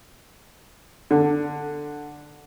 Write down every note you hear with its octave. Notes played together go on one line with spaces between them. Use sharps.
D3